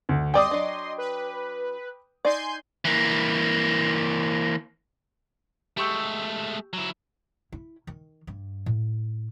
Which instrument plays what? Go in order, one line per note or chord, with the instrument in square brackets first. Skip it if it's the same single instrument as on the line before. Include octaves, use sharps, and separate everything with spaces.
[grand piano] D2
[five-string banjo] G3 D5 [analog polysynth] D#5 C6 [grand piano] G5 D6 D#6
[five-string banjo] F#3 D4
[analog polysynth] B4
[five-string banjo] D#4 D5 [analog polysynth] G#5 C6 G6
[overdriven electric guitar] E3 A#3
[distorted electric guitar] G#3 A3 [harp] G4 C#6 E6
[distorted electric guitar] F#3 E4
[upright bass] E4
D#3
G2
A2